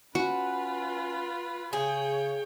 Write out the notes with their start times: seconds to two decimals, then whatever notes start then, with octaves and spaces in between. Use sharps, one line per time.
0.15 C#4 F4 F#4 B4
1.73 C#3 G#4 C#5 G5